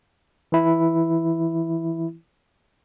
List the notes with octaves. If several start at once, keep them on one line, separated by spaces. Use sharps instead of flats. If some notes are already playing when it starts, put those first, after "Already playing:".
E3 E4